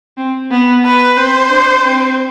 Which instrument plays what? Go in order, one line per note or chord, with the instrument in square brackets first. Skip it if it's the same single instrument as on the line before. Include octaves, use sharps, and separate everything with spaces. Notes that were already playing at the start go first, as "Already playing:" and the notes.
[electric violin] C4
B3
[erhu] B4
[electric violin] C4 [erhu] C5
[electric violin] D4
C4